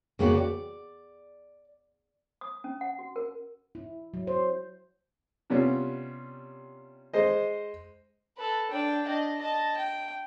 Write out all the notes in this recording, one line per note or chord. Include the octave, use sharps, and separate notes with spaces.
C#3 A#3 B3 F#4 G4
D5
D#6
C#4
F#5
F#4
A#4
E4
F#3
C5
C3 G3 B3 C#4 F4
G#3 C5 D#5
A4 B4
D4 G5
D4 D#5
D#5 A5
G5